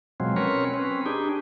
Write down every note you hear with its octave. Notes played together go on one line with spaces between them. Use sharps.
B2 F3 F#3 G#3 C4
C4 C#4 A#4 B4 C#5
C4 C#4 B4
D4 D#4 G4 G#4